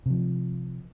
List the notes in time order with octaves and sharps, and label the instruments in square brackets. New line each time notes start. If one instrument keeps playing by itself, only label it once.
[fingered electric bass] C3 F3